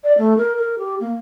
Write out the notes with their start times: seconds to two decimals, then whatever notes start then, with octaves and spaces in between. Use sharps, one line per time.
0.04 D5
0.18 A3
0.37 A#4
0.56 A#4
0.78 G4
1.00 A#3